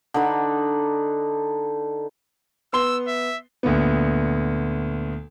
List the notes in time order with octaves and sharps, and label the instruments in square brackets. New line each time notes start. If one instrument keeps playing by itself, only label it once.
[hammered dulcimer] D3 D#4 B4 B5
[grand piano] B3 C6 G7 [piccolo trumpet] E6
[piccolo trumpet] E5
[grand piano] D2 A#2 B3